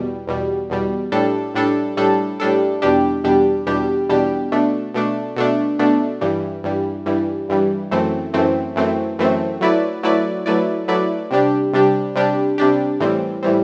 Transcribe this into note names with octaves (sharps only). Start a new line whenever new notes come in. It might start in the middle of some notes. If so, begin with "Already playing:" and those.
Already playing: E2 B2 G3
E2 B2 G3
E2 B2 G3
A2 G3 D4 A4
A2 G3 D4 A4
A2 G3 D4 A4
A2 G3 D4 A4
E2 B2 G3 D4 G4
E2 B2 G3 D4 G4
E2 B2 G3 D4 G4
E2 B2 G3 D4 G4
B2 A3 D4
B2 A3 D4
B2 A3 D4
B2 A3 D4
G2 E3 G3
G2 E3 G3
G2 E3 G3
G2 E3 G3
F#2 E3 A3 C4
F#2 E3 A3 C4
F#2 E3 A3 C4
F#2 E3 A3 C4
F#3 A3 E4 B4 D5
F#3 A3 E4 B4 D5
F#3 A3 E4 B4 D5
F#3 A3 E4 B4 D5
C3 G3 D4 G4
C3 G3 D4 G4
C3 G3 D4 G4
C3 G3 D4 G4
A2 E3 G3 C4
A2 E3 G3 C4